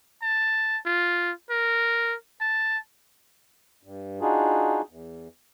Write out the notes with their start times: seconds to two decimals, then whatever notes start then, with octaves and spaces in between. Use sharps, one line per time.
0.22 A5
0.86 F4
1.50 A#4
2.41 A5
3.83 G2
4.21 D4 D#4 F4 F#4 G#4
4.89 E2